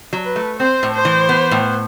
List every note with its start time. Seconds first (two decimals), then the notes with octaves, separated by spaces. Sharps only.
0.13 F#3
0.25 B4
0.36 A3
0.59 C4 C5
0.83 A2
0.94 C5
1.05 E3
1.29 B3
1.51 A2